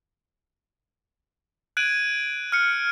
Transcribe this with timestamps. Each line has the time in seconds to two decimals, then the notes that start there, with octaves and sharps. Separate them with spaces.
1.77 F#6 G#6 D7 D#7 F#7
2.52 F6 C#7